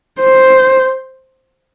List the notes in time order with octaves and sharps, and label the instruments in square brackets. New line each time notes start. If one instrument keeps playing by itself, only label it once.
[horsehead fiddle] C5